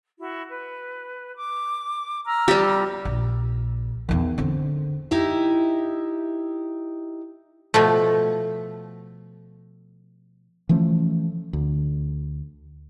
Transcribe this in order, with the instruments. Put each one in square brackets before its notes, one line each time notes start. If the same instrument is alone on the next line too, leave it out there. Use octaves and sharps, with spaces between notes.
[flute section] E4 F#4
B4
D6
A#5 E6 F6
[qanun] G3 G4
[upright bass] A#1
E2 D#3
D3 C4
[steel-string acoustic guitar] D#4 E4 G4 E5
[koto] B2 F3 A3
[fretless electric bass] E3 F3 A3 C#4
D2